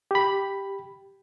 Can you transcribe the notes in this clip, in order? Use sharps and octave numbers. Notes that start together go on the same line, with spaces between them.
G4 B5